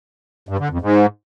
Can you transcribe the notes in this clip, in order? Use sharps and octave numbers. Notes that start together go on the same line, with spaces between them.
G2
D3
F2
G#2